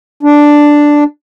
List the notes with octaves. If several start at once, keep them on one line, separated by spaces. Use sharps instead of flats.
D4